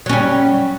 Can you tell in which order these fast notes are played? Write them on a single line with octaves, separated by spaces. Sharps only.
F#3 C#4 G3